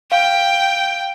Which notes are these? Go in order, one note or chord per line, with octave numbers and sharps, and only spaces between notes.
F5 G5